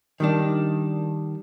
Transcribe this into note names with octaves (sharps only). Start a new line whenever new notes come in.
D#3 G3 D4